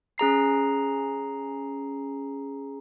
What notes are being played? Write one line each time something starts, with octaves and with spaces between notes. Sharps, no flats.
C#4 G#4 A#5 C7